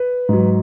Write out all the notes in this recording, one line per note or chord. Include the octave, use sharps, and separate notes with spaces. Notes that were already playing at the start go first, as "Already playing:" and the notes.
Already playing: B4
G#2 F#3